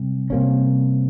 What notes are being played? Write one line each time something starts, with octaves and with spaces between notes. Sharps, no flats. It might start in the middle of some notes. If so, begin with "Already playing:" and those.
Already playing: C3 G3
C3 G3 A#3 C#4